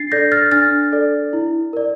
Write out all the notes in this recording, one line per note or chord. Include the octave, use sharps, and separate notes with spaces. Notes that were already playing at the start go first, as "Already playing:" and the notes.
Already playing: D4 A6 C7
A4 D5 G6 A#6
F6 A6
D4 F6 A6
A4 D5
E4
A#4 D5